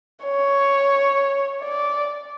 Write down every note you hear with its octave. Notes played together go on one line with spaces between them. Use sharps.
C#5
D5